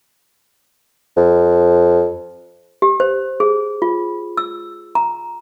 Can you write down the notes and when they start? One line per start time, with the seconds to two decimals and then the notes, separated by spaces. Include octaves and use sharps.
1.17 F2
2.82 G4
3.00 C5
3.40 G#4
3.82 F4
4.37 E6
4.95 A#5